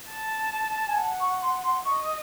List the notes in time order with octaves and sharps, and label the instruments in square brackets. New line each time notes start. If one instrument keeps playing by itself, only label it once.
[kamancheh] A5
[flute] G#5
[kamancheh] F#5 [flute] A5
[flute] C#6
C6
C6
[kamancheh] D#5 [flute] C#6